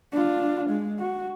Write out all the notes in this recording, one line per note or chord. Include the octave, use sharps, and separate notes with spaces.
D4 F4
G#3
F#4